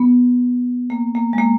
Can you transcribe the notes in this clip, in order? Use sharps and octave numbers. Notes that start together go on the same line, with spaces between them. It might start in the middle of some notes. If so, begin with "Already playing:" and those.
Already playing: B3
A#3
A#3
G#3
A#3